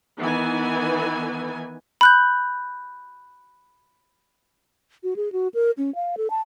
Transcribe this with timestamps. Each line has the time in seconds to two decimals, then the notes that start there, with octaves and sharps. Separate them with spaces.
0.21 D#3 E3 B3 G#5
2.01 B5 F#6 G6
5.03 F#4
5.16 G#4
5.32 F#4
5.54 A#4
5.78 C#4
5.95 F5
6.17 A4
6.30 A5